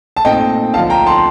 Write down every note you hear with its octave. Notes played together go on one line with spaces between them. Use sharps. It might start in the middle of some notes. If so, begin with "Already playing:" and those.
A5
A#2 A3 C4 D#4 D#5 G5
D2 D3 F3 F5 A5
G5 A#5
A5 C6